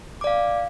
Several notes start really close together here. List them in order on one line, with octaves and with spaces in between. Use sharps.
D6 D5 F5